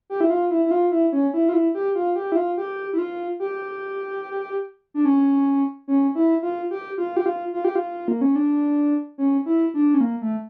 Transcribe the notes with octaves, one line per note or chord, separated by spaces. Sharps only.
G4
E4
F4
E4
E4
F4
E4
C#4
E4
F4
E4
G4
F4
G4
E4
F4
G4
E4
F4
G4
D4
C#4
C#4
E4
F4
G4
F4
G4
F4
F4
G4
F4
A#3
C#4
D4
C#4
E4
D4
C#4
A#3
A3